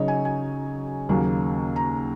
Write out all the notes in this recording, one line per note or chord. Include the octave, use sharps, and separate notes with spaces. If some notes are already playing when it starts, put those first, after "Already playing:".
Already playing: C#3 F#3 D#4 C#5 D#5
G#5
G#5
D#2 C#3 F#3 A#3
A#5